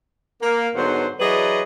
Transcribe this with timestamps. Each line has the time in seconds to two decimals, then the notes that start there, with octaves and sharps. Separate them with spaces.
0.42 A#3
0.75 G#2 D3 F#3 B3 C5
1.20 E3 F#3 G#4 B4 D5 D#5